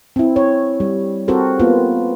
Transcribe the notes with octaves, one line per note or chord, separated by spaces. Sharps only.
C4 E4
C#5
G3
C4 F#4 G4 A4 A#4 C5
A#3 B3 F4